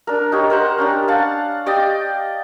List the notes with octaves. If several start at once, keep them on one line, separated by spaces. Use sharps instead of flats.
D4 A#4
D#4 G4 C#5
A#4 C5 F#5
C#4 D4 G4
F5 F#5 A5
G4 D5 D#5 G5